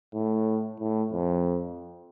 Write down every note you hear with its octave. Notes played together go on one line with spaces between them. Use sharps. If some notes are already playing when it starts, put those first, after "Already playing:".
A2
A2
F2